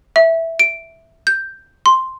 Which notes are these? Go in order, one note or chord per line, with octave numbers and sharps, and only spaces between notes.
E5
D7
G6
C6